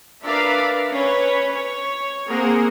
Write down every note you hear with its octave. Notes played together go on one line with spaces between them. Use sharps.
D4 A#4 B4 D5 E5 F5
C#4 B4 C#5
C#5
A#3 C4 G#4 A#4 F#5